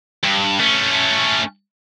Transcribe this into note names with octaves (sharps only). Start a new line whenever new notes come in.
G2
A3 C#4